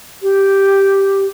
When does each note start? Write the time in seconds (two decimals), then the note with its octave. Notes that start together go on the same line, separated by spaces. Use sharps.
0.22 G4